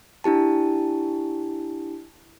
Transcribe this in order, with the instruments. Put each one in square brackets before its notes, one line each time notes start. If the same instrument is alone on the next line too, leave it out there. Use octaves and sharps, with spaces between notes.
[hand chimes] D4 E4 G4 A5